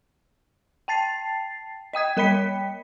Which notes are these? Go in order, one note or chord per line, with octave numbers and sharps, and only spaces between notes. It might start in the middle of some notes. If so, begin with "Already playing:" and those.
G5 A5 A6 C7
D#5 G5 D#6 G#6
G3 A#4 G5 B5 B6 C#7